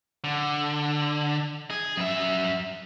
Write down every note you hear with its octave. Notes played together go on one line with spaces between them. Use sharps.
D3
G#4
F#2 E5